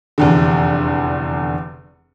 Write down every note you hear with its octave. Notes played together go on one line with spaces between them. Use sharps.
F1 E2 D3